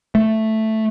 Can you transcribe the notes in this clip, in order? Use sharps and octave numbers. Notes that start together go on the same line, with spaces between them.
A3